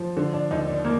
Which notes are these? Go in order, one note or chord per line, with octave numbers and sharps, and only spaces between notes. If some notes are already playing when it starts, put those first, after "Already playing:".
Already playing: F3
D3
D4
D#2 D#4
D4
A#3